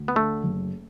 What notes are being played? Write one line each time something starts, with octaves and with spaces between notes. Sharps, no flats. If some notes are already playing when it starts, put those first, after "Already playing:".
Already playing: D2
B3
D3 A3
F#1